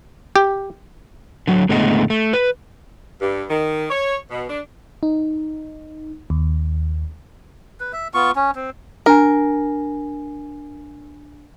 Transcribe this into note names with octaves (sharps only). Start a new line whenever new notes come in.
G4
D3 F#3
A2 D3 G#3 A3 B3 D#5
A3
B4
G2
D#3
C#5
B2
D4
D#4
D#2
B4
E5
B3 F4 C#6
C#4
C4
D4 A#4 G#5